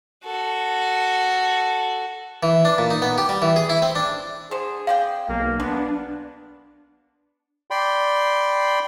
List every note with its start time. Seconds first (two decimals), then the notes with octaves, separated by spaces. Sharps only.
0.24 F#4 A4
2.43 E3
2.65 D4
2.78 A#2
2.90 D#4
3.02 B3
3.18 G4
3.29 G3
3.42 E3
3.56 G#4
3.69 E4
3.82 C4
3.95 D4
4.51 D3 G#4 C5
4.87 C4 D5 F5 G5
5.29 B1 A#3
5.60 G#3 B3 D4
7.71 D5 G5 B5 C6